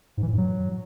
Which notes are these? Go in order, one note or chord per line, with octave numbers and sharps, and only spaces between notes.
G#2
E3
A2
G2
F#3